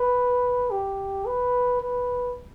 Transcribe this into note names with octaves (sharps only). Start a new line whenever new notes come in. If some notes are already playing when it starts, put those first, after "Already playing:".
Already playing: B4
G4
B4
B4